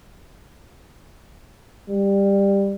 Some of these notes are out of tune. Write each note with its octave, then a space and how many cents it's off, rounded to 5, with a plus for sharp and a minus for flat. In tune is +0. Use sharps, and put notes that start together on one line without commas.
G3 +15